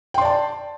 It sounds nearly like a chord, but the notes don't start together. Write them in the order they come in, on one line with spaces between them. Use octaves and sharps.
G5 C6 D5 A5